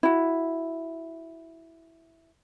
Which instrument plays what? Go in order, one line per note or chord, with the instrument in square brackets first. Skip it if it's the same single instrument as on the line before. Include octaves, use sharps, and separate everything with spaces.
[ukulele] E4 F#4